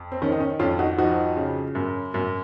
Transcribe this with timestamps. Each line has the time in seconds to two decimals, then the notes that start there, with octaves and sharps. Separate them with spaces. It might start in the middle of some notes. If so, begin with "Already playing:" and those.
Already playing: F2
0.12 C4
0.22 D#3 C#4
0.32 D#4
0.40 C#4
0.59 F2 C#4 F4
0.79 D#4 F#4
0.98 F3 D#4 F#4
1.37 C#3
1.75 F#2
2.14 F#2